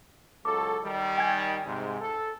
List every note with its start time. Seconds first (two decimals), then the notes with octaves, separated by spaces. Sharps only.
0.45 C#2 F#3 A4 D6
0.84 D#3 G3
1.18 G5 G#5 G#6
1.66 G#2 C3
2.01 A4